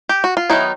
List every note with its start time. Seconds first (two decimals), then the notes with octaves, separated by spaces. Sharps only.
0.09 G4
0.24 F#4
0.37 F4
0.50 D#3 F#3 B3 D#4 E4